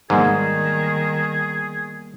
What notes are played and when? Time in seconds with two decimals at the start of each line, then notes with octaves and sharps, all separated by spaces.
0.10 G#2 D#3 G3 A#3 B3 G#4